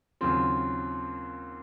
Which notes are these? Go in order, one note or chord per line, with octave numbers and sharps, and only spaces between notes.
D#2 C#3 F#3 C4 F4 C6